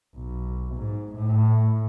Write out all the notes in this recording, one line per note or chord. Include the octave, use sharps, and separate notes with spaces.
B1
G#2
A2